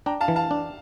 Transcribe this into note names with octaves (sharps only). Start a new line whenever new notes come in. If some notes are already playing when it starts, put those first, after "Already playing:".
D4 G5 A#5
F5 A5
E3
F5 A5
D4